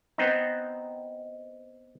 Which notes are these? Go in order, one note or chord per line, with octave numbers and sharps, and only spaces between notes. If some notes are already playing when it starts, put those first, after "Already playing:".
B3 C4 D#4